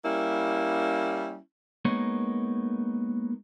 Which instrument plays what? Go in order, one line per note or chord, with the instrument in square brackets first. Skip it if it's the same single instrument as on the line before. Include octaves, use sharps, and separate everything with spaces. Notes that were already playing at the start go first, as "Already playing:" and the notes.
[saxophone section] G3 A#3 C#4 E4
[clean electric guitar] G#3 A#3 B3 D#4 A#4 C#5